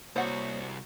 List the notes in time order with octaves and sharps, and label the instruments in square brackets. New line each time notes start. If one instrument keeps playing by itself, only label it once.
[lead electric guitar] C2 [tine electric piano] A#3 C#5 [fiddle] F#4 [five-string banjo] C5 F#5